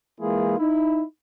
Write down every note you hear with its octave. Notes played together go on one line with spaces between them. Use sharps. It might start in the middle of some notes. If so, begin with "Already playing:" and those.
E3 G#3 A#3 E4 F4 G#4
D#4 E4